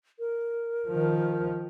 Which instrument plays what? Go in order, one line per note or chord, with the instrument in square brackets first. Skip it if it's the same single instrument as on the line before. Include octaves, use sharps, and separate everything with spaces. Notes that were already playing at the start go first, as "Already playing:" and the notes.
[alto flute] A#4
[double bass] D#3 F3